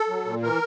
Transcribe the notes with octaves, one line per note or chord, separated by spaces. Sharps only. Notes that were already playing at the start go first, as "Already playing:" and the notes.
Already playing: A4
F#3
A#2
E3 A#4